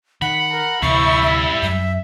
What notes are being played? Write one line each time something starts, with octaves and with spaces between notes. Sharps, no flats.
D#3 F#5 B5
A#4
D2 C3 E3 G3 E4 F5 C#6
E5
F#2 E5